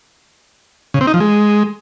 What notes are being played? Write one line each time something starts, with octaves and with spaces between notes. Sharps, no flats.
C#3
C4
D#4
F3
G#3